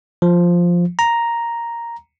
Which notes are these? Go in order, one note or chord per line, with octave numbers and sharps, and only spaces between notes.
F3
A#5